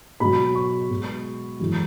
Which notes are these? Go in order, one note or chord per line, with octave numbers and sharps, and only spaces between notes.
B2 F#3 B5
C#6
B2 G#3
F#2 E3 G#3